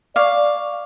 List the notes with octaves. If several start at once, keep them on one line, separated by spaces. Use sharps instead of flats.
D5 F5 C#6 D6